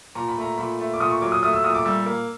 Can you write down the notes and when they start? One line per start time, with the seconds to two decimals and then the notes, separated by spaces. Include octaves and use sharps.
0.15 A#2 A#5
0.28 B5
0.37 A3 A#5
0.58 A#2 B5
0.79 A3
0.93 D6
1.00 A#2 D#6
1.11 C#6
1.21 F#3 D6
1.32 D#6
1.43 A3 D#6
1.53 E6
1.64 A#2 D#6
1.75 D6
1.85 G3 E6
2.06 A#3